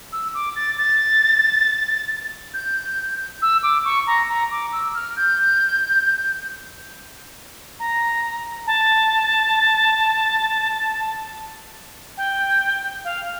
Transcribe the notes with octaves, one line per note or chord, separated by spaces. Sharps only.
E6
D6
A6
A6
G6
E6
D6
C#6
A#5
A#5
D6
E6
F6
G6
A#5
A5
G5
F5